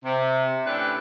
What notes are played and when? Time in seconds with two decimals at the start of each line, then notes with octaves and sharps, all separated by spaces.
0.05 C3
0.66 A2 C#4 D4 E4 G4 B4